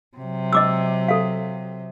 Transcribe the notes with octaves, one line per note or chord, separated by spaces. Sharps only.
C3 F#3
D#5 D6 E6
A4 F5